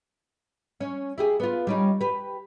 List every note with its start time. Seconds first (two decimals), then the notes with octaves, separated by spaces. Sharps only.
0.80 C#4
1.18 E4 G4 G#4
1.40 B3 F4
1.67 G3 C#4 D#4
2.01 G4 B4